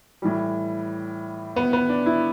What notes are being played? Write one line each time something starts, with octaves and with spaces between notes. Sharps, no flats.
A2 E3 G3
B3
B3
D4
E4